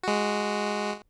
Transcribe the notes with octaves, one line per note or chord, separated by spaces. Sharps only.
G#3 F#4